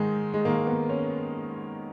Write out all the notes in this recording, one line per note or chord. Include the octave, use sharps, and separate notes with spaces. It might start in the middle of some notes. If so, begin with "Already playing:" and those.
Already playing: G#2 D#3 G#3
G#3
G#2 D#3 A#3
B3
C#4